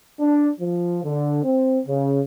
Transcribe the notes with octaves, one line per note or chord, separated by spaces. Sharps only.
D4
F3
D3
C4
C#3